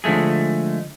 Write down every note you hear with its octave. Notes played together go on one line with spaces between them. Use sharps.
D3 F3 G#3 A3 G#4